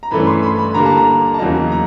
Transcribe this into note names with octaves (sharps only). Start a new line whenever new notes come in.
A#5
G2 E3 A3 C#4 B5
C6
B5
B5
D3 G3 A#3 A#5
A5
A#5
A5
E2 C#3 F#3 A#3 D#4 A#5
A#5